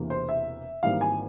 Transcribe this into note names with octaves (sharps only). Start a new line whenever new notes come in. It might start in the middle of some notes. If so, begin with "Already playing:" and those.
Already playing: E1 E2 C3 E3 A#3
C5
E5
G#1 G#2 E3 G3 A#3 F5
G#5